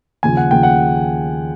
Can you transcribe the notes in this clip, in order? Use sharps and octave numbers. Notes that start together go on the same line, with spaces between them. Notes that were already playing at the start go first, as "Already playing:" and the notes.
D#2 C#3 F3 G#5
F#5
D#2 C#3 F3 G5
F#5